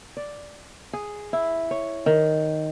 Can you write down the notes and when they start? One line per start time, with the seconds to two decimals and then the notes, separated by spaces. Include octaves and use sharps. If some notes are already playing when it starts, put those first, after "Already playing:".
0.17 D5
0.93 G#4
1.33 E4
1.71 C#5
2.06 D#3